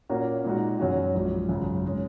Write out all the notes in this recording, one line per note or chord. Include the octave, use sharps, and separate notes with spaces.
A#2 A#3 C#4 F#4
A#2 G#3 D#4 F#4
F#2 F#3 C#4 F#4
A#1 G#2 F#3 C#4
G#1 F#2 C#3 G#3
G#3 C#4